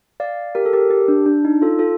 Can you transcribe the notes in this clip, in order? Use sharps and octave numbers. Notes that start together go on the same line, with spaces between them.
D5 F5
G4 A#4
A4
G4 A#4
G4
D4
D4
D#4
F4 A4
F4 A4